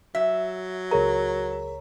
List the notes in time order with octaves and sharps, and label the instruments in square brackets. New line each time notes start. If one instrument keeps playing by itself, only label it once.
[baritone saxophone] F#3 [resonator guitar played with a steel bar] E5
[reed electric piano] C#2 C#5 A#5 [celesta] G#4 A#4